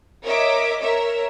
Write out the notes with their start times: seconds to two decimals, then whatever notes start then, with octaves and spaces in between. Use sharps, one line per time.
0.23 A#4 C#5 D#5 E5 D6
0.80 A#4 C#5 E5